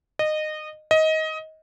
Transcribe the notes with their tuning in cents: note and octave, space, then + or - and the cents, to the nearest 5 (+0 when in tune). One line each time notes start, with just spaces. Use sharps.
D#5 -20
D#5 +20